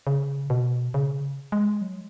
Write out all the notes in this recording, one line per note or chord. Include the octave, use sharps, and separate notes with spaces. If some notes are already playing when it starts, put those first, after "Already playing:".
C#3
B2
C#3
G#3
F#3